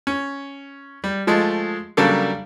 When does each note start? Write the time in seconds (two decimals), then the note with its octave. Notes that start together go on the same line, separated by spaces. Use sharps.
0.07 C#4
1.04 G3
1.27 F3 G#3 A3
1.97 C#3 F#3 G3 A#3 D4 A4